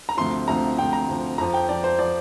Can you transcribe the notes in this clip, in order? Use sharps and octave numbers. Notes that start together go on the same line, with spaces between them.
A#5
D2 C3 F3 C6
D2 C3 F3 A#5
D2 C3 F3 G5
A#5
D2 C3 F3
F2 F3 A#5
G5
F2 F3 D5
C5
F3 D5